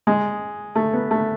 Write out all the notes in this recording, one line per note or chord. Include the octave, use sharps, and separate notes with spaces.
G#3
A3
B3
A3